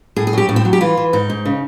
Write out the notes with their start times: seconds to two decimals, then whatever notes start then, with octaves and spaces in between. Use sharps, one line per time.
0.16 A2 G#4
0.27 G#4
0.33 F#3 G4
0.49 A2 C#4
0.56 C4
0.65 F#3
0.73 G4
0.81 E3 F4
0.97 E3
1.13 G#2 D#4
1.30 G#2
1.45 C#3